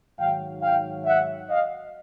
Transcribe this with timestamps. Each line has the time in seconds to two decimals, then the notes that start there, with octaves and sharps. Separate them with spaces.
0.17 G#2 D#3 F#3 F5 G5
0.62 F5 G5
1.05 E5 F#5
1.49 D#5 F5